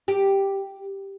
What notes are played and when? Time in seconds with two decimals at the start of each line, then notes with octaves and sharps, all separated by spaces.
0.08 G4